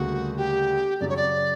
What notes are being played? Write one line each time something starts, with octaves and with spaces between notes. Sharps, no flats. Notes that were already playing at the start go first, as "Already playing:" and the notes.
Already playing: D2 C#3 G3 A#3 F#4
G4
F#2 C#3 F#3 D5
C#5
D5